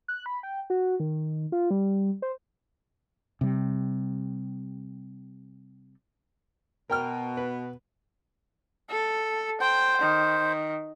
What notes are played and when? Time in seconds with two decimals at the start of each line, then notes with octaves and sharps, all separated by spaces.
0.08 F#6
0.26 B5
0.43 G5
0.70 F#4
1.00 D#3
1.52 F4
1.71 G3
2.22 C5
3.41 C3 G3
6.90 B2 A#4 G5 F6
7.37 B4
8.90 A4
9.61 C5 G5
10.02 D#3